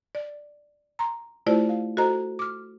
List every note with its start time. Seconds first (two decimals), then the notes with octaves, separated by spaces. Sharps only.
0.15 D5
0.99 A#5 C6
1.47 A3 E4 F4 G4 C5 D5
1.69 F5
1.97 F#4 A4 C5 D#5 A#5
2.39 D6 F6